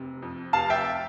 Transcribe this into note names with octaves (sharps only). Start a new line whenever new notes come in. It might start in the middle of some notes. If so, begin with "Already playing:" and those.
Already playing: F1 C3
F2
F1 F5 A5
E5 G5